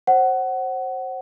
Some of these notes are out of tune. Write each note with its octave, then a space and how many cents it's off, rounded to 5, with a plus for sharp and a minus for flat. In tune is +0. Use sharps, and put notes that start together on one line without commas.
C5 +25 F#5 +20